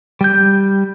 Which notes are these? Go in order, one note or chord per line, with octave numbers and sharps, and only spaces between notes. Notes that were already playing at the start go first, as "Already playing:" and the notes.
G3 G6